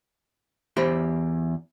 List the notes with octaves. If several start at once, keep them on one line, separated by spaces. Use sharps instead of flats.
E2 G4 C5 B5